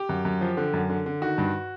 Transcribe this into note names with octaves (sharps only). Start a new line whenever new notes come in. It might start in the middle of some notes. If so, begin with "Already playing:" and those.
Already playing: G4
F#2
F#2
F3
D3
F#2
D3
D3
D#3 F#4
G2